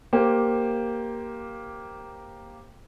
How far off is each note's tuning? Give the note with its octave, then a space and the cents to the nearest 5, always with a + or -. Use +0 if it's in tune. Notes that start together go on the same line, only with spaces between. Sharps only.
A#3 +0 G4 +0 C5 +15